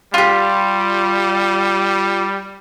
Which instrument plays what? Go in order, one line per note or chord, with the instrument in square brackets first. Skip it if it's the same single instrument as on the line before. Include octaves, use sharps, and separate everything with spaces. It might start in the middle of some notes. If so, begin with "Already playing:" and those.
[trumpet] G3 [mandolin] F4 G4